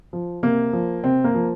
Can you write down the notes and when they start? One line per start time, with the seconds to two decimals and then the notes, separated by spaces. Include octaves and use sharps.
0.13 F3
0.43 C3 A#3
0.73 F3
1.04 C3 C4
1.24 A#3
1.34 F3